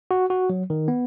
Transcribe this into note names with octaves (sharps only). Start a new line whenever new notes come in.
F#4
F#4
F#3
D#3
B3